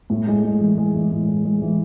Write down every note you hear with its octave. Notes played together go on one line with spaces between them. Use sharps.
A2
G#3
G#3
E3
G#3
E3
A2
G#3
G#3
E3